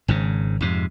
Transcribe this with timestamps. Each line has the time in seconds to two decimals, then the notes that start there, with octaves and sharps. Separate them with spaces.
0.08 G#1 G#2 C#3
0.61 F2 G#2 C3